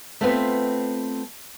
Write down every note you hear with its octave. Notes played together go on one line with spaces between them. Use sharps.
A3 B3 C4 F4 B4